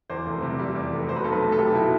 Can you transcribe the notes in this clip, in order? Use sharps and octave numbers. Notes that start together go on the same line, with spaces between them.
E2 C5
F1
C3
G3
E2
F1
B2 C5
B4
B1 A4
B4
A3
A4
B1 G4
B2 E4